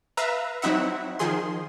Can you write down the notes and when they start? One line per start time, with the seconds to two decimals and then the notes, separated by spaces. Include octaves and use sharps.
0.17 B4 E5 F5 A#5
0.62 F#3 C4 D#4 E4 E5 F#5
1.19 D#3 F3 G#4 C6